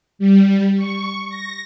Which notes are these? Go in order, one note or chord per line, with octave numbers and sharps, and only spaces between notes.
G3
C#6
A#6